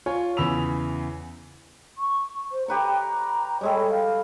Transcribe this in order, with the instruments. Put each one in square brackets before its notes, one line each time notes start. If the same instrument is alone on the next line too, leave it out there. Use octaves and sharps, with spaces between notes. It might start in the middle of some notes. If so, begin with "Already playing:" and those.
[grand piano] F4 C#5 G#5
E2 C#3 B5 E6 F7
[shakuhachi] C#6
C5
[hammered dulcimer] G4 B4 C#5 [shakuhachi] A#5
[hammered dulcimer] G3 G#3 A4 [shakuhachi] C#5
[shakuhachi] F5